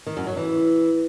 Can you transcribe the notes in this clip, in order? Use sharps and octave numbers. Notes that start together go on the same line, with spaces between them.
D#3
F#2
F#3
E3